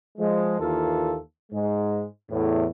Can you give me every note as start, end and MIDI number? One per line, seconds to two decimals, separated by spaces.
0.18 0.59 53
0.18 0.59 56
0.60 1.17 39
0.60 1.17 52
0.60 1.17 58
0.60 1.17 65
0.60 1.17 69
1.52 2.06 44
1.52 2.06 56
2.30 2.67 40
2.30 2.67 45